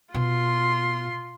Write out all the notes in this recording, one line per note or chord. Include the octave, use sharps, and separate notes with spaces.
B2 F4 C6